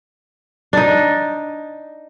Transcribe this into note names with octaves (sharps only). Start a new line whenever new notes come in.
D4 D#4